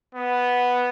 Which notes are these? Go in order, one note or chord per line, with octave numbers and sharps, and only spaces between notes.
B3